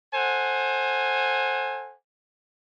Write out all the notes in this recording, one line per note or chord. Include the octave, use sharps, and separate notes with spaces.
A4 C5 F#5 G#5